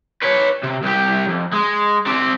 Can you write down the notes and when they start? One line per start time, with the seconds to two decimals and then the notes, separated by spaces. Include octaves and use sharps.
0.23 B4 C#5
0.64 C3
0.83 C2 G4
1.28 F2
1.54 G#3
2.06 C4 D5